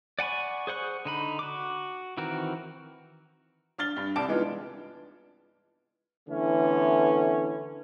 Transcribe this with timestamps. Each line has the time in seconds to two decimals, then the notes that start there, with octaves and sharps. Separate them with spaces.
0.19 D5 F#5 G#5 B5 C#6
0.67 G#4 C5 F#5 C#6 F#6
1.05 D3 D#4 B5
1.39 F#4 D6
2.17 D#3 E3 C4 F#4 A#4
3.78 D4 F6 A6 G7
3.97 G2
4.16 C2 D5 A5 D7
4.28 E3 G#3 B3 D4 D#4 F4
6.29 D3 E3 A3 B3 C#4